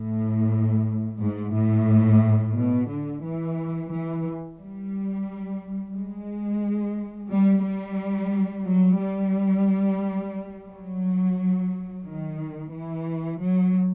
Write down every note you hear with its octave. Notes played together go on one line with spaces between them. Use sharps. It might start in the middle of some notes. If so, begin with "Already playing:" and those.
Already playing: A2
G#2
A2
B2
D3
E3
E3
G3
G#3
G3
G3
F#3
G3
F#3
D#3
E3
F#3